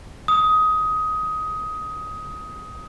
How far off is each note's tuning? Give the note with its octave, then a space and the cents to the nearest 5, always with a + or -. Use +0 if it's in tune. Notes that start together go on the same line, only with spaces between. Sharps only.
D#6 +15